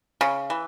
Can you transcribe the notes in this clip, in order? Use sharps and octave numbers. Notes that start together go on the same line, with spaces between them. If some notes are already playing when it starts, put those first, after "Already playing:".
C#3
E3